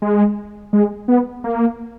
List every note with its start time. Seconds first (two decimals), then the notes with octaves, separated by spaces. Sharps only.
0.02 G#3
0.73 G#3
1.08 B3
1.44 A#3